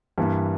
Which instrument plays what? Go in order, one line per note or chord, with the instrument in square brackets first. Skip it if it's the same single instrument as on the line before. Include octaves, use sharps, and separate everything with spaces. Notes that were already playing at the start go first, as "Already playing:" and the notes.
[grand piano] G2 E3 A#3